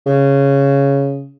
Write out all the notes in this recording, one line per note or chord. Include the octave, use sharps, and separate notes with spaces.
C#3